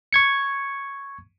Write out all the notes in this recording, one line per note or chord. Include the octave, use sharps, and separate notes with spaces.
C#6 G#6 C#7